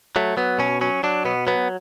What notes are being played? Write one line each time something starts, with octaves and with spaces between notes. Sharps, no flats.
F#3 A3
F#3 B3
B2 C#4
F#3 C#4
F#3 D4
B2 B3
F#3 B3